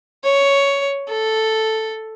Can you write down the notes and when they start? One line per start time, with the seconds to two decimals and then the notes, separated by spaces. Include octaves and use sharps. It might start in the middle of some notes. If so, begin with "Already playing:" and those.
0.24 C#5
1.09 A4